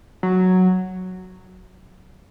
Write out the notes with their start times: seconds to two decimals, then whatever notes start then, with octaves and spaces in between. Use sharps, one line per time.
0.23 F#3